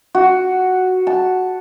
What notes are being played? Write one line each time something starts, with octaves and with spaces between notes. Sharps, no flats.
F#4
A5